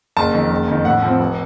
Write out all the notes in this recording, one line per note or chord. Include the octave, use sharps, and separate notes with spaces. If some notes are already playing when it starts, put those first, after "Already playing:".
F#1 A5
F2 D#3
F#1
F2 D#3
A2 F#5
F3 C4
F1